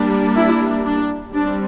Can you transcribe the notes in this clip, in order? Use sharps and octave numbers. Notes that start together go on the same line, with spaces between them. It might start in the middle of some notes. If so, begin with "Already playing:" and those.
Already playing: G3 A#3 D4
E4
D4
G3 C4 D4